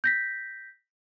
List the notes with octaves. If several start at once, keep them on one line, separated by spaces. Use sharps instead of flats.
G6 A#6 B6